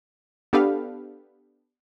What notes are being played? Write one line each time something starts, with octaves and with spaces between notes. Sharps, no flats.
B3 D4 G4 A4 B4 F5